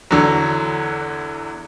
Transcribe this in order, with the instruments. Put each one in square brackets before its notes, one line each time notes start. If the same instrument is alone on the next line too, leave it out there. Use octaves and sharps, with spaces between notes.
[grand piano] E2 D3 F#3